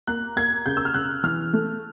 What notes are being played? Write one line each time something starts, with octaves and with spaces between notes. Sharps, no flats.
A#3 F#6
A#3 G#6
C#3 G6
E6
F6
C#3 F#6
E3 F6
A3